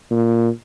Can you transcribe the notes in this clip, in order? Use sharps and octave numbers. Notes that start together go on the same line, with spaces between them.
A#2